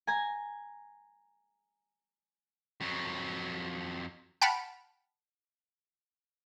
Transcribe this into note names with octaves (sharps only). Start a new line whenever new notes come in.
G#5 A#5 G#6
F2 F#3
F#5 G5 A5 B5 F6